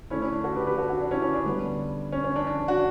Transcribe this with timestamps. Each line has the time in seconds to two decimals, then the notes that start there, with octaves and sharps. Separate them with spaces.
0.10 D3 A3 C#4 E4
0.22 C#4 E4
0.33 D4
0.44 F#4 A4
0.56 G4 B4
0.67 G4 B4
0.78 F#4 A4
0.89 D4 F#4
1.01 D4
1.11 C#4 E4
1.22 C#4 E4
1.34 D4
1.45 D3 G3 B3
2.12 C#4
2.24 C#4
2.36 D4
2.47 D4
2.68 D4 F#4